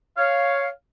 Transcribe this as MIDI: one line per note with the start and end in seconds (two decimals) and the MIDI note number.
0.18 0.69 73
0.18 0.69 77